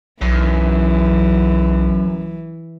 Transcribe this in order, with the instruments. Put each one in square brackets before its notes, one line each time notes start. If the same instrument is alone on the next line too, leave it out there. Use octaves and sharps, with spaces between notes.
[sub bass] B1 [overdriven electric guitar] F#2 [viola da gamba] E3